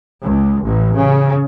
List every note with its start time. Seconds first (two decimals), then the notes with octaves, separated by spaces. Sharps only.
0.22 C#2
0.63 A1
0.96 C#3